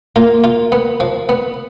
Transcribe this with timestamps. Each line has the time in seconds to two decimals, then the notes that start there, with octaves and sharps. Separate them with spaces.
0.16 A#3 F4
0.44 F4
0.72 B3
1.00 F3
1.29 B3